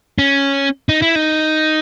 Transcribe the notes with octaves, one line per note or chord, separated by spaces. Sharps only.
C#4
D#4
E4
D#4